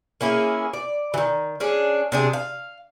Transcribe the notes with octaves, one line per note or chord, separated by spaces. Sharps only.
A#3 C#4 E4 G#4
D5
D#3 E3
C#4 D4 G#4
C3 D4 G#4
F5